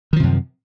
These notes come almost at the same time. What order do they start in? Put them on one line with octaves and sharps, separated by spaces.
D#3 F3 C3 F#2